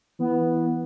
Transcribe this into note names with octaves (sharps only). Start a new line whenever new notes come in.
E3 B3